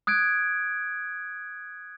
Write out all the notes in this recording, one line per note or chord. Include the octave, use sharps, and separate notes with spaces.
D#6 F#6 G#6 D7